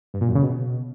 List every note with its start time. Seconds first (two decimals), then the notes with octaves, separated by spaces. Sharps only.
0.14 G2
0.21 A#2
0.28 F#2
0.35 C#3
0.42 B2